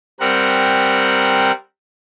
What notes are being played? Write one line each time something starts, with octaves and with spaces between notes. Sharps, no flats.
G3 C4 A#4 F#5